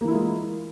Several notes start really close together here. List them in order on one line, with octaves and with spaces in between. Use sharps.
A#3 E3 E4 F4 G#3